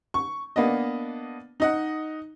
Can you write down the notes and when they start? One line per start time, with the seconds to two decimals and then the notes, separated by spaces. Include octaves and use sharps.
0.14 C#6
0.56 A#3 B3 D4 D#5
1.60 D#4 D#5 F#5